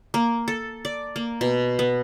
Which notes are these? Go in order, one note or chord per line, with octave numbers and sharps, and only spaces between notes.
A#3
A4
D5
A#3
B2
B3